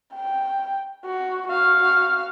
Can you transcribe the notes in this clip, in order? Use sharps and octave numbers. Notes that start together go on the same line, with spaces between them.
G5
F#4
F#4 F5